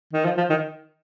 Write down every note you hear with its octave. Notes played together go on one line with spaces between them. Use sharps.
D#3
F3
F3
D#3